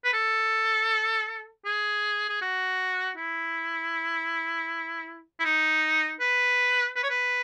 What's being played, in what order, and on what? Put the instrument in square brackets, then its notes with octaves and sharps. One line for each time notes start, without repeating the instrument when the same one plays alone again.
[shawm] B4
A4
G#4
G#4
F#4
E4
E4
D#4
B4
B4
C#5
B4